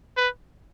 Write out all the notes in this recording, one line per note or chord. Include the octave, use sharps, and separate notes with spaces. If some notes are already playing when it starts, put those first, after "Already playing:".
B4